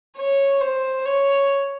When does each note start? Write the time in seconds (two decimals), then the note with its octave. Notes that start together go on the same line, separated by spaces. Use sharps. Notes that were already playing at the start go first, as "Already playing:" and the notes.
0.17 C#5
0.61 C5
1.05 C#5